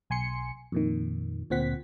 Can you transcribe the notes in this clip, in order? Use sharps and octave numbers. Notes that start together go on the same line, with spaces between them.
B1 G#5 C6 C#7
F2 A#2 D#3
D2 A#2 C4 F#5 B6